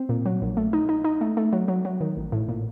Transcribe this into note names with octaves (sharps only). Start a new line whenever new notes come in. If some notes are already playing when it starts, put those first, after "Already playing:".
Already playing: C4
A#2
F#3
A#1
A3
D#4
D#4
D#4
A3
A3
F#3
F#3
F#3
D#3
A1
A2
A#2